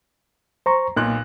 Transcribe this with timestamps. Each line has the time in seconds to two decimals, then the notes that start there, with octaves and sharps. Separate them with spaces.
0.66 C5 A#5 C#6
0.96 B1 A#2 A#3 F#6